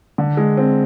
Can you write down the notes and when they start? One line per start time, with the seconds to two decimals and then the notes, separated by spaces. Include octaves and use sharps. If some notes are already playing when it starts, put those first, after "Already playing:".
0.18 D3
0.37 G#3
0.57 C4